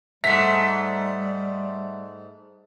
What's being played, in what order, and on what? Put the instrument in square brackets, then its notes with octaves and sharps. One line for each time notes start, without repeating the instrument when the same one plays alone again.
[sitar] G#2 A3 [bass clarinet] G3 [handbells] E5 F#5 [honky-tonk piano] B6